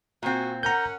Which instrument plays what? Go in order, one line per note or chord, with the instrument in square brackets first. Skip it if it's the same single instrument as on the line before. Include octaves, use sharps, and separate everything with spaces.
[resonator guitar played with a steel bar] A#2 C4 [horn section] F#4 G#5
[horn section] C#4 A#4 F#5 [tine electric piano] A#5 G6